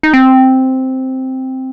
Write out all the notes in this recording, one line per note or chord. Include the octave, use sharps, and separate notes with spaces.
D#4
C4